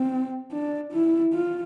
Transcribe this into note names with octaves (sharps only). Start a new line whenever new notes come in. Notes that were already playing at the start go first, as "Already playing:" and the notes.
Already playing: C4
D4
E4
F4